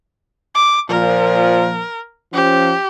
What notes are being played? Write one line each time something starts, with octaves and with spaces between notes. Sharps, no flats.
D6
A#2 F3 A#4
F3 C#4 G4